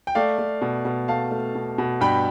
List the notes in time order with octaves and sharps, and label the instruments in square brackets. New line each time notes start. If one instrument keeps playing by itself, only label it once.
[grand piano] G5
A3 D5 F5
A3
B2
B2
A3 F5 A5
A3
B2
B2
G2 G5 B5